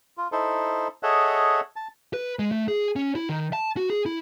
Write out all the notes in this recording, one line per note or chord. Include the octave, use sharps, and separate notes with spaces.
F4
D#4 E4 A4 C5
G#4 A4 C#5 D#5 E5 F#5
A5
B4
G#3
A3
G#4
C#4
E4
D#3
A5
F#4
G#4
E4